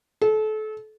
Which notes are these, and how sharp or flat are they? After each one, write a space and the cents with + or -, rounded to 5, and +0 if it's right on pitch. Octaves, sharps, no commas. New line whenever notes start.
A4 -30